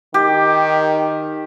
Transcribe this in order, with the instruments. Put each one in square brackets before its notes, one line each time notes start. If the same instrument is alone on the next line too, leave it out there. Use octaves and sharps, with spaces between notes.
[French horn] D#3 [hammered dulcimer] G4